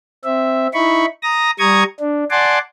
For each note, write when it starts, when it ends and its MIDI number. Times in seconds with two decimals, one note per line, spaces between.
0.24 0.67 60
0.24 0.67 76
0.74 1.06 63
0.74 1.06 64
0.74 1.06 83
0.74 1.06 85
1.23 1.51 82
1.23 1.51 87
1.23 1.51 94
1.59 1.84 55
1.59 1.84 82
1.59 1.84 85
1.59 1.84 87
1.59 1.84 92
2.00 2.24 62
2.31 2.59 74
2.31 2.59 78
2.31 2.59 80
2.31 2.59 81
2.31 2.59 84
2.31 2.59 86